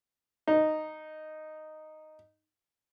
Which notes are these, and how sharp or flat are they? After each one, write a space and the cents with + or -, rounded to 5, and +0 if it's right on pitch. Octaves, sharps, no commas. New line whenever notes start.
D#4 -5